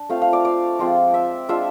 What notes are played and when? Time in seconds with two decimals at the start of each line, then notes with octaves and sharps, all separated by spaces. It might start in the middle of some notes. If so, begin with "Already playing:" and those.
Already playing: D4
0.09 A3 C4 F4 F5
0.22 F5
0.33 D5
0.45 D5
0.79 F3 G#3 C4 F4
1.14 E5
1.49 G#3 D4 F4 E5